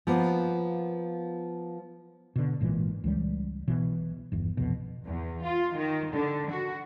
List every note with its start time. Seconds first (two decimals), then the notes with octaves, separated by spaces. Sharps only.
0.07 F3 A#3 B3
2.36 B2 D3
2.60 G#1 A#2 E3
3.04 C#2 E3 G3
3.68 B1 B2 E3
4.32 G1 E2
4.57 C2 F2 B2
5.04 E2
5.44 F4
5.75 D#3
6.12 D3
6.49 F#4